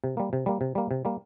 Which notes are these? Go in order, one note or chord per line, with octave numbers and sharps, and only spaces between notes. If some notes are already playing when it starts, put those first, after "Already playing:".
C3
G3 A#3
C3
G3 A#3
C3
G3 A#3
C3
G3 A#3